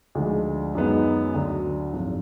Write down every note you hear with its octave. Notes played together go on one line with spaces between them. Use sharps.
D2 D3 F3 G#3
F#2 D#3 G#3 B3 D#4
D2 D3 F#3
G#1 F#2 F3